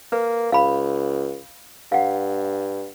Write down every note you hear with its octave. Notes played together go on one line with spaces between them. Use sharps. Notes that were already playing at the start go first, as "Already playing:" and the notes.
A#3 B4
C#2 F5 B5
G2 F5 F#5